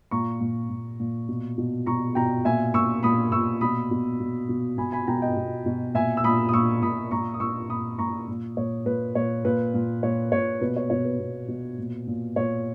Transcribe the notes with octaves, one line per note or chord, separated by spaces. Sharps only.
A#2 A#5 C#6
A#2
A#2
A#2
B2
B2
B2 A#5 C#6
B2 G5 A#5
A#2 E5 G#5
A#2 C#6 E6
A#2 B5 D#6
A#2 C#6 E6
B2 B5 D#6
B2
B2
B2
B2 G#5 B5
G#5 B5
B2 G5 A#5
D#5 G5
B2
B2
A#2 E5 G#5
E6
A#2 B5 D#6
D#6
A#2 C#6 E6
A#2 B5 D#6
A#2 A#5 C#6
D#6
A#2 C#6 E6
A#2 B5 D#6
A#2 A#5 C#6
A#2
A#2 C#5
A#2 B4
A#2 C#5
A#2 B4
A#2
A#2 C#5
A#2 C#5
B2 B4
C#5
B2 C#5
B4
B2
B2
A#2
A#2
A#2 C#5